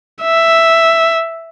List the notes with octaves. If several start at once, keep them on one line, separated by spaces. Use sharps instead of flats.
E5